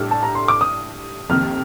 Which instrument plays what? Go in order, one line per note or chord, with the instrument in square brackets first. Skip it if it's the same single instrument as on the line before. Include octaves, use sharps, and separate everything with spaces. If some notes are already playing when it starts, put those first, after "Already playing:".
Already playing: [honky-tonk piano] A2 G3 D4 A4 [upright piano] F6
[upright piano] A5
A#5
C6
D6
D#6
[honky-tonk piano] F2 C3 D#3 A#3 [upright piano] F6